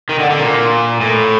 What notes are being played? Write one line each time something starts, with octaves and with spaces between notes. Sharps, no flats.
D#3
D3
D3
A#2
A2